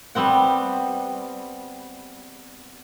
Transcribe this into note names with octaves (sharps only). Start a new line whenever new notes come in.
G3 B3 C4 F#5